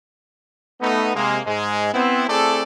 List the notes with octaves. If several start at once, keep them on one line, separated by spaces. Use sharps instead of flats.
A3 B3 D#4
C3 G#3 A#3
G#2 G#3
B3 C4 E4
A3 C4 E4 G#4 A4 D5